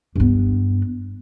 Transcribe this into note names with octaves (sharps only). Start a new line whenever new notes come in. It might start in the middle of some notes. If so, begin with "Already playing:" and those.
G2 B3